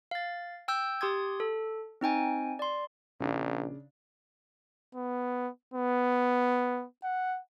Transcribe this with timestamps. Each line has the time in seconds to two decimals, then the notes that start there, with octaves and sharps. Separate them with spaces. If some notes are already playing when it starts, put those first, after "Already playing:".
0.11 F5 A6
0.68 G5 E6 G6
1.01 G4 C6 D#6 G#6
1.40 A4
2.01 C4 D#4 G5 G#5
2.59 D5 C6
3.20 A#1 C#3 D4
4.95 B3
5.74 B3
7.04 F#5